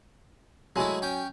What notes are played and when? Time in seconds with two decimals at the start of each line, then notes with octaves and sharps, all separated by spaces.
0.76 F#3 G#3 A3 E4 G#5
1.02 C#4 G5